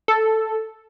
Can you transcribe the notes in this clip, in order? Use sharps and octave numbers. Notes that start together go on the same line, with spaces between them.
A4